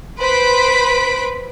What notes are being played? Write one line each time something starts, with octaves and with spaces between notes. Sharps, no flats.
B4 C5 B5 B6 D7